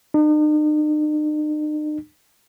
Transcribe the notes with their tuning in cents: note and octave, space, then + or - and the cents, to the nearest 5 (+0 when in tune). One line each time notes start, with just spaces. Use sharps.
D#4 -45